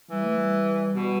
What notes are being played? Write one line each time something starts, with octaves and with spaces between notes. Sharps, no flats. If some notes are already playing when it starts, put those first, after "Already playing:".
E3 G3
A3
G3
B2